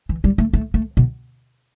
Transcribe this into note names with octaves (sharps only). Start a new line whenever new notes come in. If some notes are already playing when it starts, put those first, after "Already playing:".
E3
G3
A3
A3
A3
B2